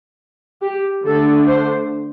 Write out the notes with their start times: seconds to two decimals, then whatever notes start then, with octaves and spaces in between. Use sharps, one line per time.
0.62 G4
1.05 D3 A3 D4 A4
1.48 C5